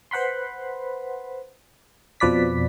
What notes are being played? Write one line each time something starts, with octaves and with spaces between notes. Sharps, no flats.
B4 C5 F#5 B5 C6
F2 B2 F3 B4 D5 B6